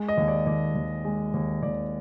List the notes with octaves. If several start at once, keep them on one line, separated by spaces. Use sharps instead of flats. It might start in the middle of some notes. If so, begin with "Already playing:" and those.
Already playing: G#3
D#5
D#2
D5
D#2 D5
D#2
G#3
D#2
D#2 D5